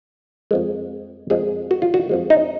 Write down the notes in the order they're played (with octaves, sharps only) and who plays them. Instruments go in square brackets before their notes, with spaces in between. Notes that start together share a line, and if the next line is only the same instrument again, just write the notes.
[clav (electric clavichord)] F2 F3 G#3
F2 F3 G#3 G#4
F#4
F4
F#4
F2 F3 G#3
D#4